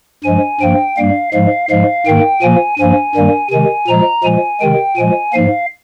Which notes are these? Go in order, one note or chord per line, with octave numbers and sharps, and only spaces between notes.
G2 F3 G#3 G#5
G2 F3 A#3 G5
G2 G3 A#3 F5
G#2 F3 G#3 F5
G#2 F3 G#3 F5
G#2 D#3 A#3 G5
A#2 F3 A#3 G#5
G2 F3 A#3 G#5
G2 D#3 G3 A#3
C3 D#3 G#3 G#5
A#2 F3 G#3 A#5
A#2 F3 G#3 G#5
C3 D#3 G#3 G5
A#2 F3 G#3 G#5
G#2 F3 A#3 F5